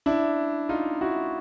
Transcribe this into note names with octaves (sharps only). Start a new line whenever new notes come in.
D4 E4
D#4 F4
E4 F#4